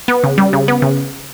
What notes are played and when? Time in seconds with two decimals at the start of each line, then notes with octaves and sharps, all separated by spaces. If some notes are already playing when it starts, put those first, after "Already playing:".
0.08 B3
0.24 C#3
0.38 G3
0.53 C#3
0.68 B3
0.82 C#3